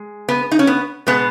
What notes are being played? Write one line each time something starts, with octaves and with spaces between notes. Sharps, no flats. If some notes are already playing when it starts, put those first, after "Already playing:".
Already playing: G#3
B3
D#4
C#4
B3
B2 G#3 B3